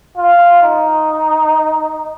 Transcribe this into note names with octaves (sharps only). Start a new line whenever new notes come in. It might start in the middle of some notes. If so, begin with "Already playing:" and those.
F4
D#4